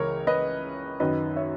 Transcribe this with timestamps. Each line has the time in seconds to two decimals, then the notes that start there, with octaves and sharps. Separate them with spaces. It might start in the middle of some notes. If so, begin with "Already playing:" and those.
Already playing: C#2 C#3 E3 A#4 C#5
0.27 B4 D#5
1.00 F#2 D#3 B4 D#5
1.36 C#5 E5